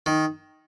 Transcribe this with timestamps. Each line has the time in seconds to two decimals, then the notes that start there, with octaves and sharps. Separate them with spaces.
0.06 D#3